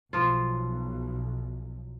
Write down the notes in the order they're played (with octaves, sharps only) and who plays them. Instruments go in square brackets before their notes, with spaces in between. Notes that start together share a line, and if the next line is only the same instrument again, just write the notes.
[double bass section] B1 [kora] F3 F4